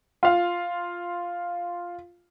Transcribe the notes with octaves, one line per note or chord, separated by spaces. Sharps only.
F4 F5